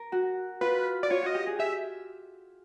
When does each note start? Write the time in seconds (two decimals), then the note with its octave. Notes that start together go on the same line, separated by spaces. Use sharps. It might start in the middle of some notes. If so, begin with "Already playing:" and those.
Already playing: A#4
0.12 F#4
0.61 F4 B4
1.03 D5
1.10 F4 C#5
1.22 F#4 D#5
1.34 G4
1.47 G#4
1.59 G4 E5